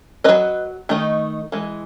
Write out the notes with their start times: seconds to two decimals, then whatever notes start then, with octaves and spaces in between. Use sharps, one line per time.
0.24 C#4 B4 D#5
0.28 F#3
0.89 D#3 A3 D#4
1.52 E3 G#3